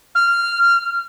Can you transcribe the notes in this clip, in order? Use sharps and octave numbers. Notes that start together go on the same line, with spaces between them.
F6